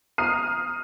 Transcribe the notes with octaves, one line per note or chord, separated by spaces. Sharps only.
A#5 D#6 F6 C7 D#7